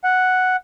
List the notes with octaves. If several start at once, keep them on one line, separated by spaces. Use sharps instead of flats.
F#5